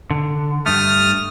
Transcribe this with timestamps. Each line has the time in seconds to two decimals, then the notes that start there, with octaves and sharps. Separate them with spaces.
0.10 D3
0.66 G2 A3 D#6 F6